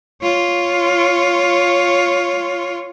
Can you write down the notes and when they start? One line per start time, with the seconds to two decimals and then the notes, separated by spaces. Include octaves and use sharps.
0.22 F4 C#5